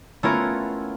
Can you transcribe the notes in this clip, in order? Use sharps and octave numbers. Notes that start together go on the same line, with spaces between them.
A3 B3 C#4 E4 F4 A#4